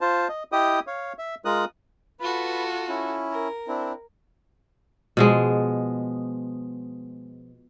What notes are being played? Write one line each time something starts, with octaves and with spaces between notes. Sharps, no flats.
F4 C5 A5
D#5
E4 G4 D#5 G5 D#6
C#5 F5
E5
G#3 F4 A#4 D#6 F#6
F4 F#4 A4 B4 B5
C#4 E4
A#4
C4 D4 E4
B2 F3 G#3